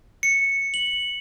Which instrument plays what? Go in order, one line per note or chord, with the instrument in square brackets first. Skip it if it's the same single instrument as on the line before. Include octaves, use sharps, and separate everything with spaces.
[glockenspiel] C#7
F#7